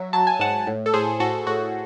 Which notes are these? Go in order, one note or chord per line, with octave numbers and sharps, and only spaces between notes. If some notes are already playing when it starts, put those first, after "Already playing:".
Already playing: F#3 E5
F#3 A5
G#5
G#2 F#5 A5
A2
A4
A2 G#4 C5
A2 F#4 A4
A2 F#4